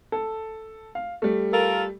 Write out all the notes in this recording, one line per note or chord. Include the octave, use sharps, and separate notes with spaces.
A4
F5
G3 A3
F4 A4 A#4